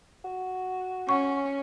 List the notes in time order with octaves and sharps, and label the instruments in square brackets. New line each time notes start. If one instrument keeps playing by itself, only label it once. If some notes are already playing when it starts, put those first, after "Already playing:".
[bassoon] F#4
[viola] C#4 [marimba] F#5 C#6